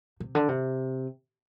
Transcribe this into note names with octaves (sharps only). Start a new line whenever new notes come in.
C3
D3
C3